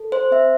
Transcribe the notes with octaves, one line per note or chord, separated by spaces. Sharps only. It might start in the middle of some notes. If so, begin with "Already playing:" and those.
Already playing: A4
C5
C4 E5